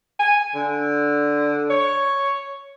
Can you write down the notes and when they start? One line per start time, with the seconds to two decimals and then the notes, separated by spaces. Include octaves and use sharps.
0.19 G#5
0.55 D3
1.70 C#5